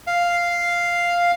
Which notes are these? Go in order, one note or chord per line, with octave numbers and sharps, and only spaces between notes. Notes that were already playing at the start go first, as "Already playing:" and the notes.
F5